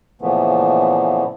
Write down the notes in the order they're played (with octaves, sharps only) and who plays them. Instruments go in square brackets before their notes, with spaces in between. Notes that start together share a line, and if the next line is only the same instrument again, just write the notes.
[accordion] A#2 C#3 E3 F3 A3 B3